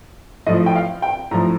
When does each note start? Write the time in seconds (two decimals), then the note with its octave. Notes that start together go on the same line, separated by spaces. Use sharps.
0.46 A2 F3 D#5
0.66 G5
0.75 F5
1.02 G5
1.31 A2 F3 A#5